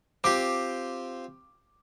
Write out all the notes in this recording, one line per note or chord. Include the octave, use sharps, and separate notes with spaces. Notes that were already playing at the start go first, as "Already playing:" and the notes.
C4 F4 G4 D6